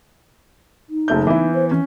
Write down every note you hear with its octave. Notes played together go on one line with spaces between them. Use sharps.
D#4
F#1 A3 G6
E3 B3 E4
C5
E3 C#4